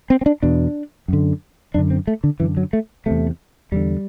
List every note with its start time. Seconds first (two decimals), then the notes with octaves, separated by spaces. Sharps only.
0.10 C4
0.21 C4
0.26 D4
0.43 E2 B2 D4
1.08 F#2 D3
1.74 F#2 D3 D4
1.91 C4
2.07 A3
2.24 D3
2.40 F#2 D3 E3
2.57 F#3
2.73 A3
3.06 E2 C3 A3
3.72 E2 D3 G3